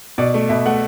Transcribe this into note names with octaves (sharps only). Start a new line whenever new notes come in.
B2 D5
A3
B2 E5
A3 F#5